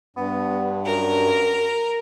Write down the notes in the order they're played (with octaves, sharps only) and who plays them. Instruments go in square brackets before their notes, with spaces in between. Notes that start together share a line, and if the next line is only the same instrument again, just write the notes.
[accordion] G2 [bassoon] B3
[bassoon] F#2 [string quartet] A#4